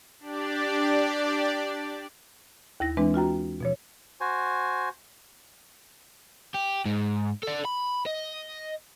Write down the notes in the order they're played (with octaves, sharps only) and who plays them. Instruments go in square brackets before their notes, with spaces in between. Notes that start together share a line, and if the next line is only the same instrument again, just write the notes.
[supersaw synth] D4 G4 D5
[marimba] D#2 E4 A#6
E3 G#3 C4 D4 B4
F4 F#4 G5 A#5
B2 F3 C#5
[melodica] F#4 C5 G#5
[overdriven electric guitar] G4
G#2
A4 D5
B5
D#5